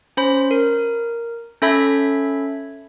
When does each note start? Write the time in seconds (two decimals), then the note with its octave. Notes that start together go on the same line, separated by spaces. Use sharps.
0.17 C#4 C5 B5
0.51 A#4
1.62 C#4 A4 E5 B5 G#6